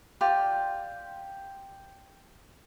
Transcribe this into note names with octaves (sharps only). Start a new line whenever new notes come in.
F4 G4 D5